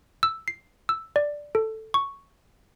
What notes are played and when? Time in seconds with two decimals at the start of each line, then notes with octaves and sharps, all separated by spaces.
0.23 E6
0.48 C7
0.89 E6
1.16 D5
1.55 A4
1.94 C#6